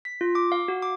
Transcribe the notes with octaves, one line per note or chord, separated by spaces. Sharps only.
B6
F4
D6
F5
F#4
D6